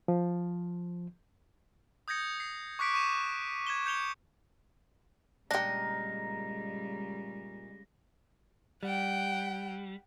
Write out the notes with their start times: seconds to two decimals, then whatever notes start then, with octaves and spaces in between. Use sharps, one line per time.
0.08 F3
2.08 D#6 G6 G#6 A#6 C#7
2.40 C7
2.79 C#6 D6 F#6 B6 C#7 D7
2.94 C#6 D#7 E7
3.67 G#6 E7 G7
3.86 G6 C#7 F7 G7
5.51 A#2 C#3 G3 G#3 D4 D#4 G4 A#6
8.83 G3 F#5 G5